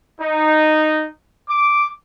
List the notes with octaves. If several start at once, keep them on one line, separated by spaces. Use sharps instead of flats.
D#4
D6